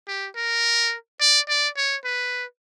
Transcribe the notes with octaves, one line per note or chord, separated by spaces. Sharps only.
G4
A#4
D5
D5
C#5
B4